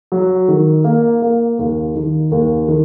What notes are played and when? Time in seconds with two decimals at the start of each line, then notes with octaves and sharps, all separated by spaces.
0.12 F#3
0.48 D#3
0.84 A#3
1.22 A#3
1.59 D#2
1.95 D#3
2.32 D#2
2.68 D#3